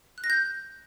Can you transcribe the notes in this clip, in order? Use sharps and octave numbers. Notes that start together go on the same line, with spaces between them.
F#6
A#6
G6